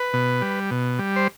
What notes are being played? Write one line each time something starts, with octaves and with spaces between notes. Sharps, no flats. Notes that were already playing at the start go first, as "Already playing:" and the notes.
Already playing: B4
B2
G3
B2
G3
C5